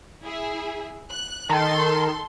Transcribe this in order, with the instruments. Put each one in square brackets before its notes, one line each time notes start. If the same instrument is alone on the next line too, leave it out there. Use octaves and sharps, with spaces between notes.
[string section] E4 G#4 E5
F#6
[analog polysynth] D#3 [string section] A4 C6